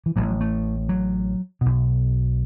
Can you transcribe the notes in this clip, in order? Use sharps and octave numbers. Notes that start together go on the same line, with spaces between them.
E3
A1 A2 F#3
F#3
A3
F#3
B1 B2